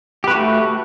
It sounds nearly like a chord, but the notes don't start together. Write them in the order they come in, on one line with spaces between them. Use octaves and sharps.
G4 B4 F#4 A3